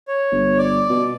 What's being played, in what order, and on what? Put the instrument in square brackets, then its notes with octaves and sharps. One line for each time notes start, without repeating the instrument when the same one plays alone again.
[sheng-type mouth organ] C#5
[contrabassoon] G1
[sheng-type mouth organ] D5
[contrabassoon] B2